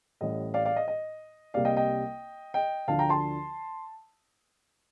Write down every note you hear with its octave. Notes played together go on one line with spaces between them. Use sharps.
A1 A2 G3 D#5
D5 F5
D5 F5
D#5
D#5
C2 C3 G3 A#3 D5 F5
D#5 G5
D#5 G5
D#5 G5
D2 D3 F3 F5 A5
G5 A#5
A5 C6